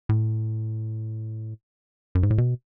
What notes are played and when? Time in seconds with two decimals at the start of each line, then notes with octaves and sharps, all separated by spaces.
0.09 A2
2.15 F#2
2.23 G#2
2.31 A2
2.38 B2